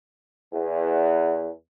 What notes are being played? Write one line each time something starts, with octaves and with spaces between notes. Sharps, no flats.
E2